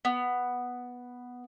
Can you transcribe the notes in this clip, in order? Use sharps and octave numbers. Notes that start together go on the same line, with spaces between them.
B3